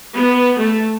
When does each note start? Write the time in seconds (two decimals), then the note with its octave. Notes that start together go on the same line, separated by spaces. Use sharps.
0.15 B3
0.58 A3